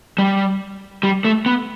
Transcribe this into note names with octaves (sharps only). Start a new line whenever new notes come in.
G3
G3
A3
B3